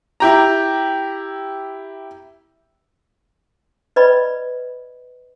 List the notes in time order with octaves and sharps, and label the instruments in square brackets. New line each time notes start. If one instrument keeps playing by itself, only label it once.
[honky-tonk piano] E4 G4 A#5
[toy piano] B4 D5 D#5 B5